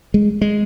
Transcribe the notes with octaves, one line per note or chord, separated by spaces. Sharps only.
G#3
G#3